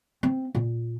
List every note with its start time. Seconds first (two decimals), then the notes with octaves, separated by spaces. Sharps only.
0.23 C4
0.55 A#2